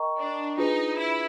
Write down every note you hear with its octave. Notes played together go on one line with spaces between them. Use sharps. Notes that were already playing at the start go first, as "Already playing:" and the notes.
Already playing: A#4 D#5 G5 A#5 C#6
D4
D4 D#4 F4 G#4 B4
E4